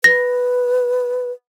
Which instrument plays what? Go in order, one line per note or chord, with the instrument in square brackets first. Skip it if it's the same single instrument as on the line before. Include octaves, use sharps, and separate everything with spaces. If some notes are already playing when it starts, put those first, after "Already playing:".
[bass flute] B4 [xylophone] A#6